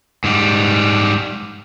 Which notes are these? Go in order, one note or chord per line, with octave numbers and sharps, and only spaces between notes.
G#2 G3